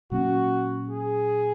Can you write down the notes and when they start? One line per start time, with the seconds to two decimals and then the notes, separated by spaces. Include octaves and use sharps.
0.12 A#2 F#3 A#3 C#4 F#4
0.89 G#4